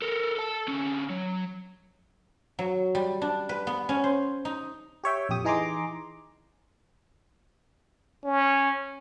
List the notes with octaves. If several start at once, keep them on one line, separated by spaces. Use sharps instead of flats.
A4 A#4
A4 A5
D3 C#4
F#3
F#3
G3
D4
B4
B3
C#4
C5
D#4
G4 C#5 E5 G5
A#1 F2 G4 D#6
E3 D#4 G#4 A#5 C6 D6
C#4